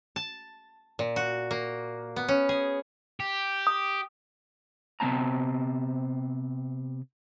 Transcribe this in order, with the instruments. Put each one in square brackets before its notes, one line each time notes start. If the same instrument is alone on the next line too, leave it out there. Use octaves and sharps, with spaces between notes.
[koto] A5
A#2
F#4
A#3
B3
C#4
G#4
[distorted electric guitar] G4
[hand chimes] D#6
[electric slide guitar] C3 B3 C4 A5 A#5